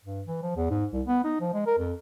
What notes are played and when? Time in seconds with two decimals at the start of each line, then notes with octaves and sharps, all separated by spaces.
0.05 G2
0.27 E3
0.43 F3
0.57 E2
0.70 G#2
0.93 C2
1.07 B3
1.24 D#4
1.41 F3
1.54 G#3
1.67 A#4
1.78 F2